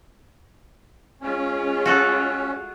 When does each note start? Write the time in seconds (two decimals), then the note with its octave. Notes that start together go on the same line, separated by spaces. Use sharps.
1.21 G#3 C#4 F4
1.86 F#4 A4